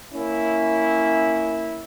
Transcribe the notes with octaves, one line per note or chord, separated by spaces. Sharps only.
A#3 C#4 E4